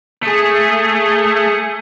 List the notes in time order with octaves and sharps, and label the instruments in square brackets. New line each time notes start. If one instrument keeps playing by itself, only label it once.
[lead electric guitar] A3 [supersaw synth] G#4 D#6 C#7